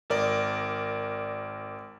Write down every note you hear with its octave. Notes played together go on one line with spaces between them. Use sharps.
G#1 A#4 D5